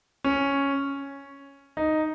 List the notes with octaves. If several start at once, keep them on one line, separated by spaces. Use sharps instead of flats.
C#4
D#4